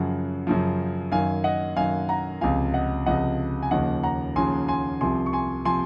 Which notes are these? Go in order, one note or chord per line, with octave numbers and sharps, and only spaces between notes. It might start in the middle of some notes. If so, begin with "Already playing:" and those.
Already playing: F#2 C#3 F3 F#5
F#2 C#3 F3
F#2 D#3 F5 G#5
D#5 F#5
F#2 D#3 F5 G#5
F#5 A#5
C#2 C3 F3 F5 G#5
D#5 F#5
C#2 C3 F3 D#5 F#5
G#5
D#2 C#3 F3 D#5 F#5
F#5 A#5
D#2 C#3 F3 G#5 C6
G#5 C6
C2 C3 F3 G#5 C6
C#6
G#5 C6
C3 F3 G#5 C6